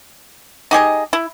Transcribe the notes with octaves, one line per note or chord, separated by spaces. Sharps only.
D#4 G4 G#4 D#5
E4